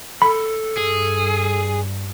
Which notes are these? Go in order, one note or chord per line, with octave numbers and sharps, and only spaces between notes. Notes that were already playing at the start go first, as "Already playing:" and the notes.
A4 B5
G2 G#4